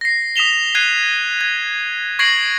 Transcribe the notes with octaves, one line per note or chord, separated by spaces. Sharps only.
A#6 C7
D#6 B6 E7 F7 G7
F#6 G#6 C7 D#7 G7
G#6
C#6 G#6 A#6 C7 D7 F#7